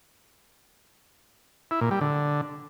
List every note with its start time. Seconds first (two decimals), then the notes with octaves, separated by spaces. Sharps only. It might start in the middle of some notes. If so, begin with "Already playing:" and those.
1.71 E4
1.81 A#2
1.91 G3
2.01 D3